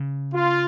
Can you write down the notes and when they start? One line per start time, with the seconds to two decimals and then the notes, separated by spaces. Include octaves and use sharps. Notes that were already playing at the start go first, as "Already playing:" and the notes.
Already playing: C#3
0.33 F4